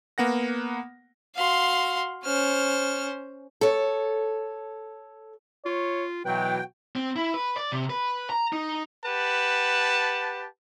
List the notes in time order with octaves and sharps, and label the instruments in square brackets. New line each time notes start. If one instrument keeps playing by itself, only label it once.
[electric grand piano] A#3 B3 F#5 A#6
[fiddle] F#4 C6 [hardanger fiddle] F5
[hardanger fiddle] C#4 C5 [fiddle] F6
[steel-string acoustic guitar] A4 C#5
[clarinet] F4 [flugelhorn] C#5
[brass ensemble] B2 E3 F#3 [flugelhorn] F#4 [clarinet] B4 [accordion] G5
[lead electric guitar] C4
E4
B4
D5
C3
B4
A#5
D#4
[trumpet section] G4 B4 F#5 A5